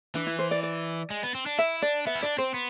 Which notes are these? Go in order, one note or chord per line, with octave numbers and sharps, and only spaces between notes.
E3 D4
E4
C5
D5
D5
G#3
B3
C4
D4
E4 E5
D4 D5
B3 E5
E4
D4 D5
C4 C5
B3